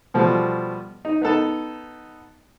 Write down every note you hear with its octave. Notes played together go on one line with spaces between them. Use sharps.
B2 F3 G3 A3
D#4
B3 D#4 A4 A5